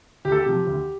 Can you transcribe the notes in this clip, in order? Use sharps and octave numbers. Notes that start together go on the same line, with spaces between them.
D2 G4
A4
G4
C3 F3
D2